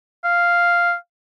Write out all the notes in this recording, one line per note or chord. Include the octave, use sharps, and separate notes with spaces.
F5